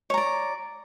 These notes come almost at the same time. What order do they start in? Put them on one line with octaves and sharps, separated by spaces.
C#5 A#5 D5